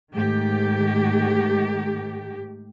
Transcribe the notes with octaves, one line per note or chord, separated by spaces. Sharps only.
G#2 D#3 A3 G4